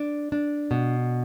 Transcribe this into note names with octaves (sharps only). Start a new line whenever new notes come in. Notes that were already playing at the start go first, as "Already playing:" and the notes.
Already playing: D4
D4
B2